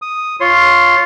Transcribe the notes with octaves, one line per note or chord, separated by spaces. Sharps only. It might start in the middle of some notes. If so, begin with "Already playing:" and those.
D#6
F4 C#5 C6